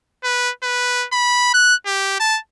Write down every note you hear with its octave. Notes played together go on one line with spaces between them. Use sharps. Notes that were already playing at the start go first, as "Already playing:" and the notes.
B4
B4
B5
F#6
G4
A5